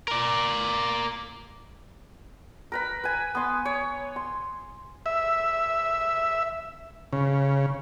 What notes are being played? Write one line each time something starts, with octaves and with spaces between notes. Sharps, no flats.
A#4 D5
A#4 B4 B5
B4 G#5
B3 C6
C#5
C6
E5
C#3